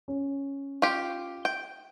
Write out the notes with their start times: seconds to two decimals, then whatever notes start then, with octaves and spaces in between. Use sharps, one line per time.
0.08 C#4
0.82 F4 G4
1.45 G5